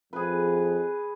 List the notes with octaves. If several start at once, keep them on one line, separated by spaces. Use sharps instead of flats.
F2 G#4 B4